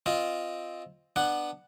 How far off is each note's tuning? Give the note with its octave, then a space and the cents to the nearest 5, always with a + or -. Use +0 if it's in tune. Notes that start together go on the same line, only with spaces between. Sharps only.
C4 +0 F4 +0 D#5 +0
B3 +0 D4 +20 F#5 +0